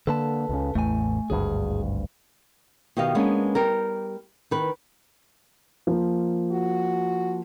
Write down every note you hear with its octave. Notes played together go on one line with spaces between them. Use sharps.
D3 A#3 A4 B4 A5
C#2 C#3
A1 E2 A2 A3 G#5
G#1 D2 G2 G#4
B2 D#3 G4 D#5 F5
G#3 A#3 B3 C#4 D4
G3 G4 A#4
D#3 B4
F3 A#3
F#4